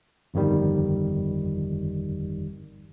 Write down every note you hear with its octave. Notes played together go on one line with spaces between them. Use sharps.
G1 F2 D#3 G3